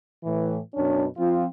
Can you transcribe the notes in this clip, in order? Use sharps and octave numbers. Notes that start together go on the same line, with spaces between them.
A2 E3
F#2 B2 C#4 D4
F3 C4 F4